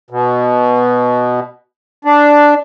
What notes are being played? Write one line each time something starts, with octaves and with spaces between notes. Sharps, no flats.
B2
D4